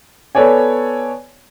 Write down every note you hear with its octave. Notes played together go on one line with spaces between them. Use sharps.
B3 A4 C#5 D5 G#5